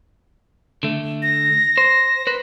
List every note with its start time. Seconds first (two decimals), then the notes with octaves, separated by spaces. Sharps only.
0.83 D3 A3
1.23 A#6
1.78 C5
2.27 B4 C5